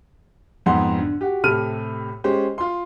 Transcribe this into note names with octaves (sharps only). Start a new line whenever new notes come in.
F2 G#2 B3 F#5 C6
D3
F#4 G4
A2 C3 G4 A4 F6 D#7
G#3 C#4 G4 C5
F4 C6